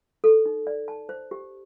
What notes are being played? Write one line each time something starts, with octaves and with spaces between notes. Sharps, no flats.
A4
D#4
D5
A5
C5
G4